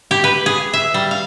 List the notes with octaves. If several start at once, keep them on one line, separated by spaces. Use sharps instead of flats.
G4
B4
G#4
E5
G3
F5